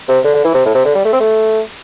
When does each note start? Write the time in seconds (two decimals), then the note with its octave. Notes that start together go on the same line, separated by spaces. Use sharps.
0.08 C3
0.24 D3
0.34 D3
0.44 E3
0.54 C3
0.65 A2
0.75 C3
0.85 D3
0.95 G3
1.05 A3
1.13 C4
1.20 A3